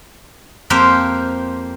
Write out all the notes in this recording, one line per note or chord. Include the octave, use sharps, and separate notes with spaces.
F2 A#3 G4 C5 F5